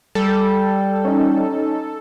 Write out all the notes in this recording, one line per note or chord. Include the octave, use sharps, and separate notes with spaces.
G3 A4
C#4 D#4